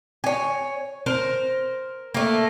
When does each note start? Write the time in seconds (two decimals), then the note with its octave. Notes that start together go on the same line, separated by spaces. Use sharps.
0.24 C#5 G#5
1.06 A#4 C5
2.14 A3 A#3